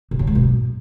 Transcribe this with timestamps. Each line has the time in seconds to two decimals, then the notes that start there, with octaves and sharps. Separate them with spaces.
0.11 A#2
0.19 C#3
0.27 G#2
0.35 B2
0.43 F#2